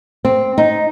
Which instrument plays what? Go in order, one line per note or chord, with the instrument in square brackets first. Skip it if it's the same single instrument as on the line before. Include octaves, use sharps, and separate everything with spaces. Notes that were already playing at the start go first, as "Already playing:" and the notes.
[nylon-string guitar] C4
D#4